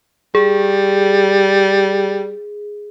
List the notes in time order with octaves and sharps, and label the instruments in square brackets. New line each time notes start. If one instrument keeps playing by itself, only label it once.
[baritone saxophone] G3 [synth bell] G#4